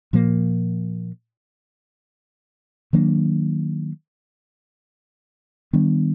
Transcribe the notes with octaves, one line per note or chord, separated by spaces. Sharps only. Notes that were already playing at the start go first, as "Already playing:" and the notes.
A#2 F3 A#3
D#3 F#3 A#3 D4
D#3 G3 B3 D4